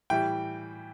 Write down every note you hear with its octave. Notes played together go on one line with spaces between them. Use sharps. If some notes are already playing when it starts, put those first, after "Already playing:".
A2 E3 G3 G5